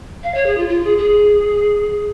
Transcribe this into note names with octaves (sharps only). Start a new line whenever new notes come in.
F5
C#5
G#4
F4
F4
G#4
G#4